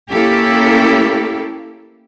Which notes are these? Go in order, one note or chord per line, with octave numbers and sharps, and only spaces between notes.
A#3 C#4 E4 G4 A4